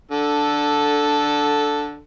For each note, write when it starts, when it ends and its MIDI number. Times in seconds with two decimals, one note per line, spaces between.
0.11 2.00 50
0.11 2.00 69